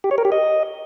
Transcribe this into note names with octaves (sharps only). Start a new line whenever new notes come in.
G4
C#5
A#4
G4
D#5